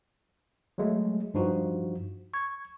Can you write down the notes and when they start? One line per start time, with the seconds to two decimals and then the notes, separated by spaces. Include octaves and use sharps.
0.78 F#3 G#3 A3
1.34 G2 F3 D#4 F#4
2.34 C#6 G#6